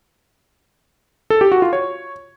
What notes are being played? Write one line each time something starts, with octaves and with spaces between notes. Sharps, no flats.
A4
G4
F#4
F4
C#5